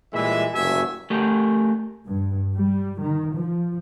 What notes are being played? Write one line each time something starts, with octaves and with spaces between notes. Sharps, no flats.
A#2 E3 G3 G#3 E5
F#1 D2 G2 F#4 E5 G#5
A3 G4 A#4
G2
G3
D#3
F3